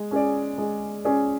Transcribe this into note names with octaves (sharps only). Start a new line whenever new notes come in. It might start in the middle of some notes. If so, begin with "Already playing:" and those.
Already playing: G#3
C#4 G#4 D5
G#3
C#4 G#4 D5